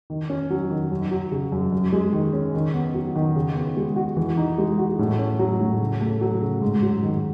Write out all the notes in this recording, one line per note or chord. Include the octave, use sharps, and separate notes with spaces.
D#3
C#4
F#3
D#3
F#2
F#3
C#3
F#2
F#2
G#3
D#3
C#4
D#3
B3
F#3
D#3
C#3
B3
G#3
F#4
E3
D#4
G#3
F#4
A2
C#4
F#3
A2
C#3
A3
F#3
C#3
G#2
F#3
D#3